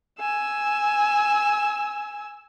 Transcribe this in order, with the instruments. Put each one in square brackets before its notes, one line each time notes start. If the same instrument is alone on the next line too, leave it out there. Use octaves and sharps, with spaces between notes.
[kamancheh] G#5 E6